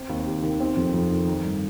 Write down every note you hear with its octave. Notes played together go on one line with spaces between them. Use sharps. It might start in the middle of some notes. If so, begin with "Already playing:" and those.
Already playing: C4
D#2
G4
D#3
C4
F2
F2
D#3
D#4
G2